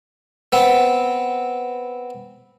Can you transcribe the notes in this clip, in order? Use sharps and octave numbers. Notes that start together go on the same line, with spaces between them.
B3 C4